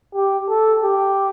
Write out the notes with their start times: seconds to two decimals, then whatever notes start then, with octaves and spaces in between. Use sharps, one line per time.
0.15 G4
0.49 A4
0.83 G4